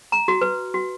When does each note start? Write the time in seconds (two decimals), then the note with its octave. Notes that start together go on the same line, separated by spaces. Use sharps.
0.12 A#5
0.28 F#4
0.41 B4
0.74 F#4